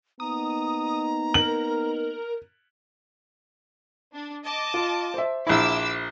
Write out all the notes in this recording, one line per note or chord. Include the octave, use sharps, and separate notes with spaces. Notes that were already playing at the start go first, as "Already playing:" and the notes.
A#3 B3 D#4 A#5 D#6
A#4 F#7
D4
D#5 A5 D6
F4
C5 E5
A#1 E4 D6 E6